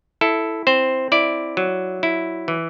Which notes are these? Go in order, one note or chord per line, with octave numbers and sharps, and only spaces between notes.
E4 A4
C4 C5
E4 D5
F#3
E4
E3